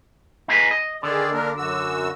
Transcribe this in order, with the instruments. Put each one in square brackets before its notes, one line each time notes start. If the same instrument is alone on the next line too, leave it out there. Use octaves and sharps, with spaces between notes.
[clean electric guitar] D#4 G#4 B4
D#5
[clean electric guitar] D3 [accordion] D#3 G#4 D5
[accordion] A#3 D4 A#4
F#2 F#4 E6